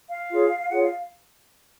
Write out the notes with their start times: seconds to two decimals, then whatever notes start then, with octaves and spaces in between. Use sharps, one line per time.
0.09 F5
0.30 F4 G#4 C#5
0.69 F4 G#4 C#5 F#5
0.83 F5